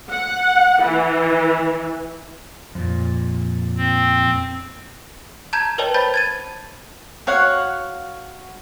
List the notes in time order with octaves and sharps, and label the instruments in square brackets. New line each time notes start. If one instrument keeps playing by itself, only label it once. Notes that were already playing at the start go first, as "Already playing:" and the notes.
[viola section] F#5
E3
[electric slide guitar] F2 A#2
[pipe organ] C4
[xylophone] A5 A#5 G6 G#6 E7
A#4 B4 C#5 D#5 G5 A5
C5 A5 B5 G6 A6
G#6 A6 D#7
[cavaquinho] F#4 C#5 F5 F#5